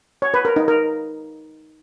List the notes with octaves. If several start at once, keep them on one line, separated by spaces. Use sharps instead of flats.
C#5
B4
A#4
D#4
A#4